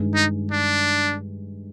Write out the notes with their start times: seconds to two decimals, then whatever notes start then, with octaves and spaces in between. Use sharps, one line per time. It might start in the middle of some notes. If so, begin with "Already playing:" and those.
Already playing: G2 D#3 G#3
0.15 D#4
0.51 D4